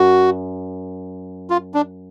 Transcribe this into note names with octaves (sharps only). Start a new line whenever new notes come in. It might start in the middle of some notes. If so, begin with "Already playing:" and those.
Already playing: F#2 F#4
F4
D4